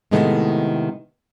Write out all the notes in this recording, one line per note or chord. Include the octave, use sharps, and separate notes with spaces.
A2 C3 D#3 G#3 A3 B3